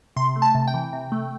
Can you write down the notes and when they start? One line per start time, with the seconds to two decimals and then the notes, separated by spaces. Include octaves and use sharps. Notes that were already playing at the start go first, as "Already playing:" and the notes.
0.16 C3 C6
0.36 A3
0.42 A5
0.55 C3
0.68 G5
0.74 E3
0.93 C3
1.12 A3